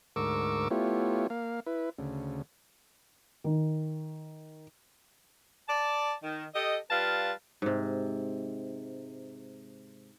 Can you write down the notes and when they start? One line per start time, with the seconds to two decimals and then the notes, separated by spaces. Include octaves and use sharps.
0.16 D2 G#2 A#4 C#6 D6 E6
0.71 A3 B3 E4 F4 G4 C#5
1.30 A#3 F5
1.66 E4 B4
1.99 D2 C#3
3.44 D#3
5.68 D5 A5
6.23 D#3
6.54 G4 A4 D#5
6.90 G3 F4 B4 F5 A5
7.62 G#2 C3